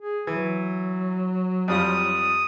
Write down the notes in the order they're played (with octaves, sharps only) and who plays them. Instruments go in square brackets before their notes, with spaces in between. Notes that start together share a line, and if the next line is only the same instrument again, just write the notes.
[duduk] G#4
[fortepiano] E3 [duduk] F#3
[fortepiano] F2 G3 F4 [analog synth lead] D#6